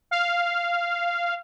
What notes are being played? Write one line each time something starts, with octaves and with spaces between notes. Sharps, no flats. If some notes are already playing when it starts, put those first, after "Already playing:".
F5